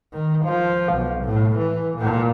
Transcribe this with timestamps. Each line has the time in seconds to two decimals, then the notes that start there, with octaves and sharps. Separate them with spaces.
0.13 D#3
0.46 F3
0.93 B1
1.25 A2
1.59 E3
1.98 A#2